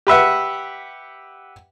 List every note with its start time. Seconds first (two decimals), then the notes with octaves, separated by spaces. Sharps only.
0.07 G4 B4 E5 F#5